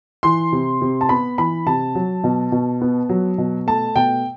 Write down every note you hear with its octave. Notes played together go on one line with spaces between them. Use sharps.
E3 C6
C3
C3
A5
B3 B5
E3 B5
C3 A5
F#3
B2
B2
B3
F#3
B2
A3 A5
B2 G5